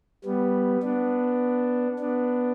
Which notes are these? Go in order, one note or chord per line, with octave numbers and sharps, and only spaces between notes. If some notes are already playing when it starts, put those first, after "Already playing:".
G3 B3
B3 D4
B3 D4